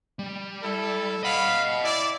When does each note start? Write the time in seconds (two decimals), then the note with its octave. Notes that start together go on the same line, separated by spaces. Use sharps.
0.19 G3
0.62 E4 A4
1.23 D#5 F5 F#5 B5
1.83 E4 D5